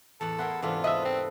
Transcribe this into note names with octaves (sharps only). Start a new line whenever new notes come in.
E2 A2 A4 F#5
E4 G#4 A#4 E5 F#5 C6
G#2 C3 E3 D4 F4 A4 C5
C3 B4 D#5 E5 B5
C4